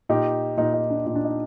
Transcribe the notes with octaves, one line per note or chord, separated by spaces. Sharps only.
A#2 D#4 G4
A#2 D#4
D#4
D4
A#2 D#4
D4
D#4